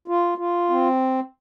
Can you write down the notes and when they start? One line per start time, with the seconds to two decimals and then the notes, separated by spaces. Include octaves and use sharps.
0.08 F4
0.38 F4
0.70 C4